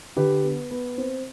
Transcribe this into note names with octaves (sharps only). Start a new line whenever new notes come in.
D3 G4 B4
B3
B3
C4